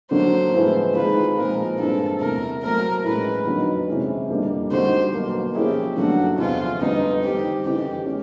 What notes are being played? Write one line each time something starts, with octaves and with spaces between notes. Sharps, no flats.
D3 F#3 A#3 D4 C5
A2 F3 G#3 B3 E4
D#3 G#3 C4 F4 G#4 B4
A#2 F3 G#3 C4 A#4
G2 E3 G#3 C4 A4
E2 C3 E3 A3 A#4
F#3 A3 C4 A#4
A2 E3 G#3 C#4 B4
F2 D3 F#3 B3 D#4
C3 E3 G#3 C#4
F2 D3 G3 A#3
D3 G3 C4 D#4 F#4 C5
B2 F#3 A#3
F3 A#3 C#4 E4 G4 G#4
G2 D3 F#3 A3 C#4 F#4
E2 C3 F3 F4
F2 D3 G3 B3 D#4
D#3 G3 C4 G4
F2 C#3 E3 G4
G#3 C#4